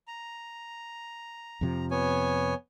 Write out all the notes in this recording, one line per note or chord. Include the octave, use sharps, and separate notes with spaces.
A#5
F2 C3 F3
B3 C#5 G#5